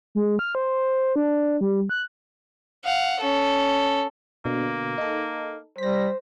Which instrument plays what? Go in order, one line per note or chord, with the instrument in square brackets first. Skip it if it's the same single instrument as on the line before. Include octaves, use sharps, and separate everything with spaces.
[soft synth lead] G#3
F6
C5
D4
G3
F#6
[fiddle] F5 F#5
C#4 A4
[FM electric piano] B2 D3 [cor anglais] A#3
[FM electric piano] D#4 A4
[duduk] G3 [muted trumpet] C5 [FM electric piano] A#6 B6